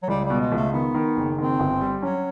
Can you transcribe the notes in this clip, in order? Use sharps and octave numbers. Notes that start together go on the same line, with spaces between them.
F#3
C#2 G3
G3
B2
G#3
C#2 A3
D#3 B3
D#3
F#1
D#3 C4
G1
G3
F#3 C#4